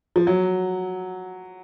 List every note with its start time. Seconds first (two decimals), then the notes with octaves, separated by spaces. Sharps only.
0.16 F3
0.27 F#3